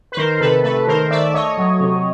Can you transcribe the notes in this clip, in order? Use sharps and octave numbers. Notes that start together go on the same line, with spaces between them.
B4
D#3 A#4 C5
C3 A4 B4
A3 A4 B4
D#3 A#4 C5
A3 D5 E5
A3 C#5 D#5
F#3
C3